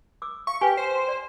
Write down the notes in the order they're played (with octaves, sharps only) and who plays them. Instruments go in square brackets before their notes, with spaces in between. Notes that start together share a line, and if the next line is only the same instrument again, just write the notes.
[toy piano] D6 E6
[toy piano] F5 [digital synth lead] C#6
[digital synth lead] G4 [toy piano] B4 G#5
[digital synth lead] C5
[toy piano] D5